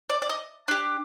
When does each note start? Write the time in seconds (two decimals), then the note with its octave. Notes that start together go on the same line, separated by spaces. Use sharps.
0.10 D5
0.22 D5
0.29 D#5
0.68 D4 G4